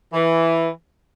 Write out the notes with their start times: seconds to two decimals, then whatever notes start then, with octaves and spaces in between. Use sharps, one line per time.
0.13 E3